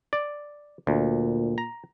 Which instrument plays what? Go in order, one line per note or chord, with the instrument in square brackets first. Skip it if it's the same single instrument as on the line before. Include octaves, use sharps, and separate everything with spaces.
[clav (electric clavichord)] D5
[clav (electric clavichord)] D2 [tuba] A#2
[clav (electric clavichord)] A#5